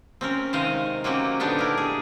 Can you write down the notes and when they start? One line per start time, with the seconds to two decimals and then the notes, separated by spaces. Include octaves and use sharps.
0.21 C4 C#4 A#4
0.53 C3 D#3 G#3 D#4 D#5 F5
1.04 F#3 A#3 C4 C#4 G4
1.40 A#2 D3 B3 D4 D#4 G4
1.59 E4 A#4
1.78 G#4